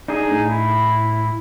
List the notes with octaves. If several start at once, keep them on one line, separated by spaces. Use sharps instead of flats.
D4 D#4 G#4
A2
E4